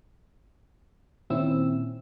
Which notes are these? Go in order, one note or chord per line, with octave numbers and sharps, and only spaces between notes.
A#2 D#3 C4 C#4 E4 E6